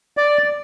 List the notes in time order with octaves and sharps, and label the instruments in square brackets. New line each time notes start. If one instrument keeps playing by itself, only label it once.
[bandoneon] D5